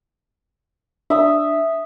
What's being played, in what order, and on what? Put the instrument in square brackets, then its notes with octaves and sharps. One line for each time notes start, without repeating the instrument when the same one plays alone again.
[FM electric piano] D4 [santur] E5 D#6